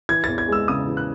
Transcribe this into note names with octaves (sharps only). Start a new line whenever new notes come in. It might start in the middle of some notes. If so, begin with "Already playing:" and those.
E3 G#6
E2 A6
G#6
G#3 E6
C#3 D#6
E3
F#6